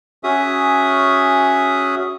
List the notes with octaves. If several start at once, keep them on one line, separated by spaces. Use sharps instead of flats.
C#4 F#4 G#4 E5 D#6